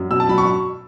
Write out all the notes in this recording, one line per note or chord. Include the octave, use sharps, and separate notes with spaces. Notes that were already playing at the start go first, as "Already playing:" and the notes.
Already playing: F#2
B2 E6
A5
F#3 B5
C#6